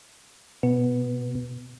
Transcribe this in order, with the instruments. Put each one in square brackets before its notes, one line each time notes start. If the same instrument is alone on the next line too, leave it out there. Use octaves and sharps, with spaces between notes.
[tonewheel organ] B2 [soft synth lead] B3